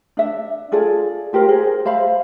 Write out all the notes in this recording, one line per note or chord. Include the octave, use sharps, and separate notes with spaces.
D4 E5
F4 G#4 A4 D5
F4 G4 A#4 C5
G#4 A#4 C5
C5 E5 F5 B5